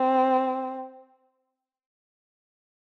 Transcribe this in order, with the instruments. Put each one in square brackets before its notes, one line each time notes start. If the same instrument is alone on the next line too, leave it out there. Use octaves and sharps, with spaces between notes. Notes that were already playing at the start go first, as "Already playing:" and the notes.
Already playing: [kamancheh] C4